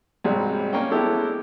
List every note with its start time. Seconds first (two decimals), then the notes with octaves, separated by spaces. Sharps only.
0.24 C2 G#2 F#3 G3
0.73 A#3 C#4 G5
0.91 G#3 B3 E4 G4 A4